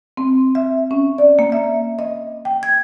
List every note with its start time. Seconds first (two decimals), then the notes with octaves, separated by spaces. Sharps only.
0.17 C4
0.55 E5
0.91 C#4
1.18 D5
1.39 A#3
1.52 E5
1.99 D#5
2.45 G5
2.63 G#6